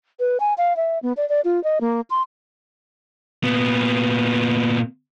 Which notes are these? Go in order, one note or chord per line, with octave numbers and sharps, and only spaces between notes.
B4
G#5
F5
E5
B3
D5
D5
F4
D#5
A#3
C6
A#2 B3